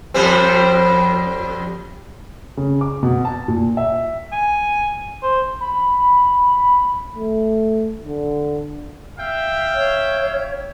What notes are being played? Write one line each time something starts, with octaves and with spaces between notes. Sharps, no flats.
F2 G3 C4
C#3
D6
B2
A5
A#2
E5
G#5
C5
B5
A3
D3
E5 F5 G5
C#5